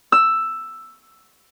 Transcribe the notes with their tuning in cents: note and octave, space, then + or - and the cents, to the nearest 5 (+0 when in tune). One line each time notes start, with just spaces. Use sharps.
E6 +5